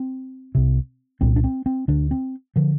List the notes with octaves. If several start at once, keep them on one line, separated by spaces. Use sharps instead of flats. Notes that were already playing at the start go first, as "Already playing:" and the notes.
Already playing: C4
C2 C3
C2 A#2 C4
D4
C4
C4
D2 D3 D4
C4
D3 F3